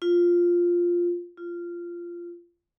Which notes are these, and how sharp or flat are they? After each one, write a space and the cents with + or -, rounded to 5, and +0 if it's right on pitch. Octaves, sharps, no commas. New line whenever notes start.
F4 +0
F4 -15